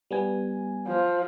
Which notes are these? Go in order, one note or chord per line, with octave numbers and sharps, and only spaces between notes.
G3 B3 G#5
F3